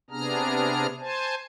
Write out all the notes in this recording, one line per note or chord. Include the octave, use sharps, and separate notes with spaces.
C3 B3 D4 G#4 A#5 F6
C5 G#5 A5